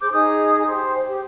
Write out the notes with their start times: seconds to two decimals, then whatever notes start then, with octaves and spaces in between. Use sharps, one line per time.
0.01 G#4 C5 D6 G6
0.12 D#4 G#4 D#6
0.67 G4 C5
1.06 G4